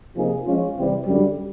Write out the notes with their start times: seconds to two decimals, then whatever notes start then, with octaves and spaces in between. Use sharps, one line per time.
0.15 C3 F3 A#3 D#4 G#4
0.45 F3 G#3 C#4 F4
0.76 C3 E3 G3 C4
1.06 F#2 D3 G3